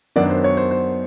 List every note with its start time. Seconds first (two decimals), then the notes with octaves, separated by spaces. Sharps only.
0.16 F#2 D#3 F#3 B3 D4 D5
0.29 C5
0.44 C#5
0.57 C5
0.71 C5